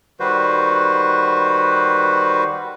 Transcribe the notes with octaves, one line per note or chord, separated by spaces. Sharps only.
D#3 G3 F#4 B4 C5